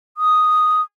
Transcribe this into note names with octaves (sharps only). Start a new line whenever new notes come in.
D#6